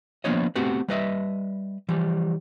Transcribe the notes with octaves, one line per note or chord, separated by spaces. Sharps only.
F3 A#3 B3 D4 C#5 D#5
A3 B3 C4 F#4 G4 B4
G3 B4 D#5 E5
E3 F3 G3